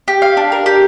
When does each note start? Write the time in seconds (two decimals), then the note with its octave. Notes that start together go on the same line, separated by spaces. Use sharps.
0.08 G4
0.22 F5
0.37 D4
0.52 A#4
0.66 G4